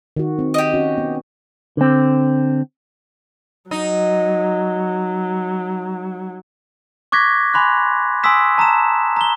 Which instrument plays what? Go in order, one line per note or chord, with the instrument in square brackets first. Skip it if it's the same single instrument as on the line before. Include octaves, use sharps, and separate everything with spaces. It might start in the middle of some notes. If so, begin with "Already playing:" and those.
[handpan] D#3 F#4
C4
[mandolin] G4 D#5
[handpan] C#4 F#4
B3
[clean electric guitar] D3 C4
[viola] F#3 [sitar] D#4
[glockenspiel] C#6 D6 F#6 G#6 A#6 B6
G#5 B5 C6 F#6
G#5 C6 D#6 E6 B6 E7
A5 A#5 E6 E7
A#5 G7